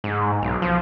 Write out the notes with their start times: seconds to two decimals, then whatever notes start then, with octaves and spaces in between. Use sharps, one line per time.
0.04 G#2
0.42 B1
0.62 F3